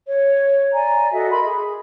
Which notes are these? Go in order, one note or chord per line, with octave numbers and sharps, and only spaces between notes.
C#5
D5 G#5 A#5
F#4 A4 D#5 E5
A#4 B5 C6
G#4